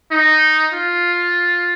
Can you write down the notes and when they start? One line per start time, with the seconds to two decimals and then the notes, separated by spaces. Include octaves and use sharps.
0.11 D#4
0.73 F4